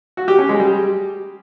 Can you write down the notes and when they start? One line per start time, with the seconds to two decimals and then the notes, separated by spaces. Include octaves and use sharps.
0.17 F#4
0.28 G4
0.39 C#4
0.49 G#3
0.60 G3